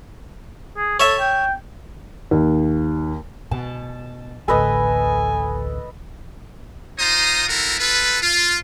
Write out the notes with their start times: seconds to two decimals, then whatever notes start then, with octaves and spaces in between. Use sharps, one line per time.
0.77 G#4
1.00 A4 C#5 E5
1.20 G5
2.31 D#2
3.51 B2 A5
4.48 A1 D2 A4 B4 D#5 G#5
6.99 D#4 F4 C5 A#5 D#6
7.48 C4 E4 F#4 A4 A#4
7.79 F4 A4 B4
8.22 F4